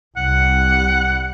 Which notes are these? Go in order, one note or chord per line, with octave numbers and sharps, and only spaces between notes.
C2 G3 F#5